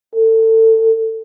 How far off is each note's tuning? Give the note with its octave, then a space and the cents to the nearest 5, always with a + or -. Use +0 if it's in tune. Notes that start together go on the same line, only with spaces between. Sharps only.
A4 +25